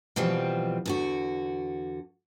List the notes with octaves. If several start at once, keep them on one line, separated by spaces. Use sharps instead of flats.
B2 E3 F3 G3 C4
E2 D3 F#4